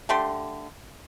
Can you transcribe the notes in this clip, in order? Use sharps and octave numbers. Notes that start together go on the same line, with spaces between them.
D3 A3 G4 C6